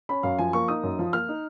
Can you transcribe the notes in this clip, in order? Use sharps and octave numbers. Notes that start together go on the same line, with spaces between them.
C#4 B5
F#2 F5
F3 G#5
A#3 C#6
D#4 D#6
F#2
F3
A#3 F6
D#4